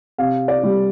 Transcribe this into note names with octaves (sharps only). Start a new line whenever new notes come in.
C3 F5
D5
G3